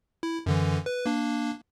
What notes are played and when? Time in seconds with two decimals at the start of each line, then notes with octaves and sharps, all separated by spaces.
0.23 E4
0.46 F#2 D3 E3
0.86 B4
1.06 A#3 D4